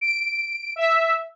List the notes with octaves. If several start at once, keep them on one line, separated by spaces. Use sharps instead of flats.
D7
E5